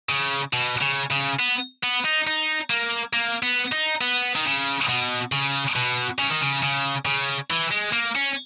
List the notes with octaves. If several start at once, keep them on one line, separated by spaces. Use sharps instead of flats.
C#3
B2
C#3
C#3
B3
B3
D#4
D#4
A#3
A#3
B3
D#4
B3
D#3
C#3
B2
C#3
B2
C#3
D#3
C#3
C#3
C#3
E3
G#3
A#3
C#4